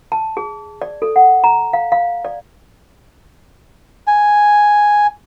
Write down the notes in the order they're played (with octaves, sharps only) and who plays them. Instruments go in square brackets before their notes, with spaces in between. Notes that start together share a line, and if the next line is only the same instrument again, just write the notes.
[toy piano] A5
G#4
D5
A4
F#5
A#5
F5
F5
D5
[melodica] G#5